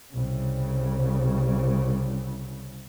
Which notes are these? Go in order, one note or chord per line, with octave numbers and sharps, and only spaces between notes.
C2 C#3